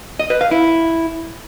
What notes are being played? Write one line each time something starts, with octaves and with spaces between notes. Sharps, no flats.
D#5
B4
F5
E4